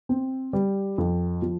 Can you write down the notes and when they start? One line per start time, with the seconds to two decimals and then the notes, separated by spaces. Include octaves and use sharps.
0.09 C4
0.53 G3
0.98 F2
1.42 F3